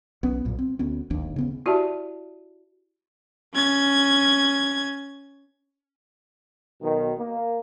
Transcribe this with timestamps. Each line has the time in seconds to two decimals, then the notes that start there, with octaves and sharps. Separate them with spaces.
0.23 B1 B3 C#4
0.45 B1 G2 A#2
0.59 C4
0.79 D2 B3 C#4
1.10 D1 G#1 D#2 D4
1.36 C#3 B3 C#4
1.66 E4 F#4 G4 D5 E5 A5
3.54 C#4 G#6
6.82 B1 B2 D#3
7.18 A#3